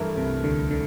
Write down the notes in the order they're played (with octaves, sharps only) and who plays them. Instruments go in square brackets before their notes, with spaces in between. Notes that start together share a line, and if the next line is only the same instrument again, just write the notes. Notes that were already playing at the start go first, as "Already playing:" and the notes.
Already playing: [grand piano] G2 E3 A3 E4 A#4
[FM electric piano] C2 C3
D2 D3
D3